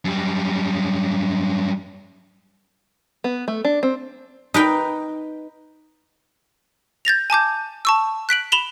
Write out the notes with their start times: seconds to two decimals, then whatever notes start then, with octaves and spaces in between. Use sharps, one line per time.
0.05 F#2 G3
3.24 B3
3.48 A3
3.65 D4
3.83 C4
4.54 D#4 B4 G5
7.05 G6 A6 A#6 F7
7.30 G#5 A5 D6 G6
7.85 A5 C#6 E6
8.29 F#6 B6 D7 F#7
8.52 B5 E7 F7 G7